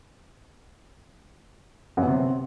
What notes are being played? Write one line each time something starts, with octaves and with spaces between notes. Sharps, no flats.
F#2
B3
C3